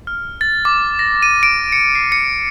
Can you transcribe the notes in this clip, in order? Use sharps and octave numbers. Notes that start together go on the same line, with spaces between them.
F6
A6
D6
A#6
D#7
D7
C#7
C7
C#7